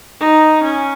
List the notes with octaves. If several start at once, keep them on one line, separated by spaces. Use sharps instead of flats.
D#4
C#4